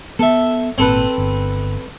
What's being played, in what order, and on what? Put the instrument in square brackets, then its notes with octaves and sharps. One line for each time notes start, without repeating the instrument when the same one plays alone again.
[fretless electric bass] B3 [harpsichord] A4 E5
[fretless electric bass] G#1 A#2 [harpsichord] C4 A4 B4
[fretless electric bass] G1